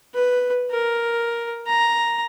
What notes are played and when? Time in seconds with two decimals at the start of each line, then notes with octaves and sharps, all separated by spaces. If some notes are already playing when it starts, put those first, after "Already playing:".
0.14 B4
0.71 A#4
1.67 A#5